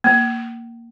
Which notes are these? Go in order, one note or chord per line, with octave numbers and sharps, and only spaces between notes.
A#3